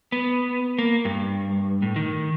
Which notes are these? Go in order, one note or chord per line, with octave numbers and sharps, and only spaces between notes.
B3
A#3
G2
A2
D#3